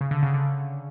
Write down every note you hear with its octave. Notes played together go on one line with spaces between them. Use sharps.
C#3
D3
C#3
D3